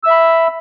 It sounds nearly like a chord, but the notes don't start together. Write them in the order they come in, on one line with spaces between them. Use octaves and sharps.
E6 E5 B5